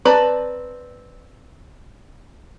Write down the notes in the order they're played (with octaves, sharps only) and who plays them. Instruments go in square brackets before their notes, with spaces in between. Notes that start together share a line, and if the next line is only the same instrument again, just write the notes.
[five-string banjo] C4 B4 D5 A5 A#5